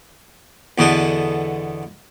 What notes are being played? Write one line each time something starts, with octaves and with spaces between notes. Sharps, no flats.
E2 B2 D3 B3 A4